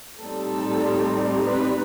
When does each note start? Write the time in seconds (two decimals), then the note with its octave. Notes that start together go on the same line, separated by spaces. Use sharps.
0.20 A2 G3 C4 D#4 A4
1.46 B4